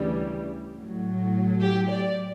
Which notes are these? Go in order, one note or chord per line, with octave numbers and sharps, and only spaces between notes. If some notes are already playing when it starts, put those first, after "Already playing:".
Already playing: D2 C#3 E3 G3
A2 F#3
G4
D5